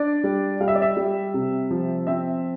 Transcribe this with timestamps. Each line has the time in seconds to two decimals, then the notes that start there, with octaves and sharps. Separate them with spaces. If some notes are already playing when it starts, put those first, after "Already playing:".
Already playing: D4 D5
0.24 G3
0.60 G3 F5
0.68 E5
0.75 D5
0.82 E5
0.97 G3
1.34 C3
1.71 F3
2.07 C4 E5